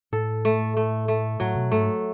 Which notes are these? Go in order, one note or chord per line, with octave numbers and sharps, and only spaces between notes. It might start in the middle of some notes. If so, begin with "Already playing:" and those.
A2 A4
A3
A3
A3
A2 F#3
B2
G#2 A3